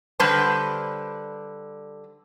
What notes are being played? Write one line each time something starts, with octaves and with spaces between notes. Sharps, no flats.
D3 G3 B4 C5 A5